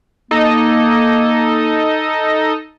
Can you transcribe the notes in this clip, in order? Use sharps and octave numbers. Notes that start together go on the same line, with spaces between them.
A#3 D#4 A4 D#5